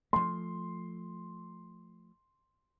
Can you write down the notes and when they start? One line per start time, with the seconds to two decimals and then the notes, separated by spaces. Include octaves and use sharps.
0.13 F3 A3 C6